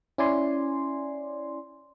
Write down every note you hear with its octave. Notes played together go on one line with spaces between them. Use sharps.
C#4 E4 D5 G#5 C6